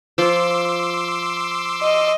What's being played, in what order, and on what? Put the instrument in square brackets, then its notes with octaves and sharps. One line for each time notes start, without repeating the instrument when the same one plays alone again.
[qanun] F3 [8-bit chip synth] C6 D6 E6
[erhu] D#5